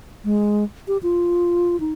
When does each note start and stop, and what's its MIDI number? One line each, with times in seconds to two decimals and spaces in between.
0.24 0.64 56
0.88 0.98 67
1.03 1.79 65
1.80 1.93 63